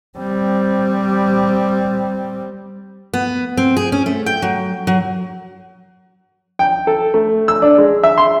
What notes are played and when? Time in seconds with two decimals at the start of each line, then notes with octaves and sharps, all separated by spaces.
0.18 G3 C4
3.14 B3
3.57 C4
3.77 G#4
3.92 C#4
4.06 A3
4.26 G5
4.42 F#3
4.87 F#3
6.59 G5
6.87 A4
7.14 A3
7.48 E6
7.62 D4
7.78 G#3
8.03 E5
8.18 C6